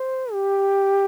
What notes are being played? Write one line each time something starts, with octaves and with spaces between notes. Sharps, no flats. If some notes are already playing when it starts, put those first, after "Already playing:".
Already playing: C5
G4